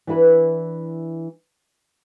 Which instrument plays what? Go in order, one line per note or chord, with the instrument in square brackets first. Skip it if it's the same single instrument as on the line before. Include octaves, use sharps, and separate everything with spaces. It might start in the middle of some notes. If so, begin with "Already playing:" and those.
[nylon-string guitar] E3 D4 E4 B4